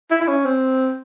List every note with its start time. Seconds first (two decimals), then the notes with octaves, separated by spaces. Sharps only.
0.11 E4
0.21 E4
0.28 C#4
0.45 C4